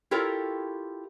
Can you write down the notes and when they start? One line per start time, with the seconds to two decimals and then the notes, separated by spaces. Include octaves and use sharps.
0.11 E4 F4 G4 A4 A#4 C#5